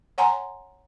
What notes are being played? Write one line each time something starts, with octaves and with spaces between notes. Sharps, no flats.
C#5 F#5 G#5 A#5 C6